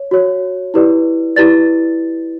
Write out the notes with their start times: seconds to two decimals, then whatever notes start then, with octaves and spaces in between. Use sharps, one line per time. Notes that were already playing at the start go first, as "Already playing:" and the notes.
Already playing: C#5
0.11 F#4 C#5
0.74 E4 G4 B4 D5
1.36 E4 G4 B4 D5 A6